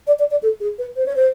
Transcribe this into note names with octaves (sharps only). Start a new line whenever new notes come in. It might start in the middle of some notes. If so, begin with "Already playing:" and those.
D5
D5
D5
A4
G#4
B4
C5
C#5
C5